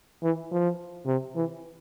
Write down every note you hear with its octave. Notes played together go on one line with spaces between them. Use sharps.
E3
F3
C3
E3